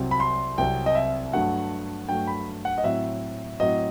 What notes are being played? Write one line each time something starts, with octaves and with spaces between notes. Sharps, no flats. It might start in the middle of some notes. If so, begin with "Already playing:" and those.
Already playing: C2 C3 F#3 C4
B5
C6
C2 C3 F#3 C4 G5
D#5
E5
G2 F#3 A3 F#5
G2 F#3 A3 G5
B5
F#5
D#5
A2 F#3 C4 E5
A2 F#3 C4 D#5